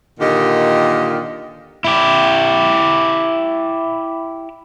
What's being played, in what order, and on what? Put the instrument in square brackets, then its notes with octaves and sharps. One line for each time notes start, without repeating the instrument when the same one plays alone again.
[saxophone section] A#2 D3 D#3 G4 A#4 D#5
[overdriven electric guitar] E4 G4